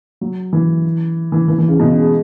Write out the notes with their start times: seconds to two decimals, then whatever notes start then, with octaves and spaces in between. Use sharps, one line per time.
0.21 F#3
0.53 E3
1.32 E3
1.48 E3
1.59 E3
1.68 C#3
1.80 B2
1.89 C#3
2.00 G#3